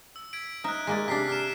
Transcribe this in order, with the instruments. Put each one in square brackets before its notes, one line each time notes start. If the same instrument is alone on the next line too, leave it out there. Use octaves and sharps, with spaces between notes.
[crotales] E6
G#6 B6 D7
[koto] D#4 E5 [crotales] F6 F#6
[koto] G#3 A#3 D5
[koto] C3 D4 [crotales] B6 C7
[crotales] F6 C7 E7